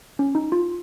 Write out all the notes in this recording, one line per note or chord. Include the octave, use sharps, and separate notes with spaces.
C#4
D#4
F4